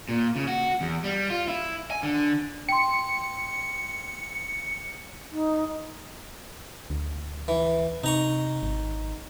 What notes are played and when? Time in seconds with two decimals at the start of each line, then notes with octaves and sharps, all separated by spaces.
0.09 A#2
0.36 C#3
0.48 F#4
0.81 E2
1.04 G3
1.30 F4
1.48 E4
1.91 G#5
2.03 D3
2.69 G5 C6 C#7
5.32 D#4
6.90 D2
7.48 E3
8.04 C3 D#4 A#5 C#6
8.62 G#1